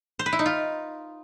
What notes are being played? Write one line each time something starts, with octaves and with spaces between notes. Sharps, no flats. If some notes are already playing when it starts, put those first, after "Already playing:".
C5
B4
E4
D#4
F4